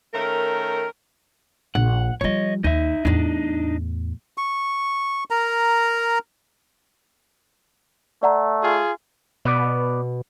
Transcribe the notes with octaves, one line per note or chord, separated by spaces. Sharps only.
D#3 A3 C#4 A#4
A#1 F#5
F3 G3 C#5 D#5
D#2 D#4 E5
E2 A2 D4 D#4
C#6
A#4 A#5
A3 D5 F#5 A#5
F4 G#4
B2 B3 B4 D5